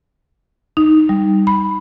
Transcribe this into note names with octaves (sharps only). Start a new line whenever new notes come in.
D#4
G3
B5